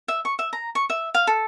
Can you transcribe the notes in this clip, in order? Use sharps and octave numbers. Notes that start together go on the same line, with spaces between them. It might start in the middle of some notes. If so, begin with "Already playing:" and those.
E5
C#6
E5
A#5
C#6
E5
F5
A4